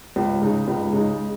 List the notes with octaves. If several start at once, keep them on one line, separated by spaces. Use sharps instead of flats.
C#2
C#3 G#3 D#4
C#2
C#3 G#3 D#4